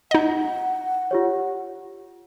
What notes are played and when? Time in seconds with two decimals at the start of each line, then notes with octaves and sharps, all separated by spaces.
0.11 D#4 D#5 F#5
1.11 F4 G4 C#5